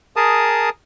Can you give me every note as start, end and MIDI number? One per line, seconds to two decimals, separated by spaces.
0.16 0.70 68
0.16 0.70 70
0.16 0.70 81
0.16 0.70 87